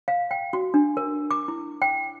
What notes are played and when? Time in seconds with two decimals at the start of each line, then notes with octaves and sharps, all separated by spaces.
0.08 F5
0.31 G5
0.53 F#4
0.74 D4
0.97 A#4
1.31 D6
1.48 E4
1.82 G5